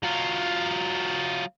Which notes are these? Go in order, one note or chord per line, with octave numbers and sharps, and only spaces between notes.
F#3 F4